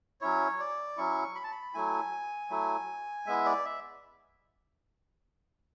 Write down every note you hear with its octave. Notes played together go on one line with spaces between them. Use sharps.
F#3 C#4 E4 C#5
D5
F#3 C#4 E4 C#6
B5
A5
B5
F#3 A3 E4 G#5
F#3 A3 E4
G#3 B3 E4 E5
D5
E5